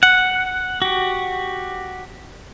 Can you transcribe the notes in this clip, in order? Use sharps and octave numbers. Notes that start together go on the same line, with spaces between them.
F#5
F#4 G4